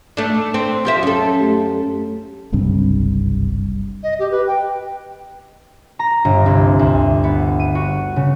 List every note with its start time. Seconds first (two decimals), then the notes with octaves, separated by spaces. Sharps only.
0.17 A3 D4
0.54 C4
0.85 F3 G4 E5 F5 C6
1.03 F#2 C#4 A4
1.39 A3 G4
2.52 F#1 C2 G2 C4
4.03 D#5
4.19 G4
4.31 B4
4.47 G5
5.99 A#5
6.25 G1
6.46 C2
6.79 D2
7.24 B3
7.60 D#7
7.75 F#4
8.16 C#3